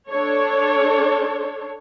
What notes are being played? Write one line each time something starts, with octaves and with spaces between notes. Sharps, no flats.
D4 A4 C#5